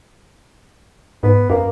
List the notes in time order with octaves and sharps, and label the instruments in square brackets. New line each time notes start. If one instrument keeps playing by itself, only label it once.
[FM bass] G#2 [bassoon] B3
[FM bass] F#2 [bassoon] A#3